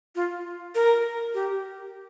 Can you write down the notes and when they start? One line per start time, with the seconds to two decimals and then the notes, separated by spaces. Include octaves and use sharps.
0.15 F4
0.75 A#4
1.34 G4